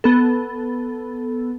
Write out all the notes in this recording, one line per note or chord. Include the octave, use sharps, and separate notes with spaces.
B3 A4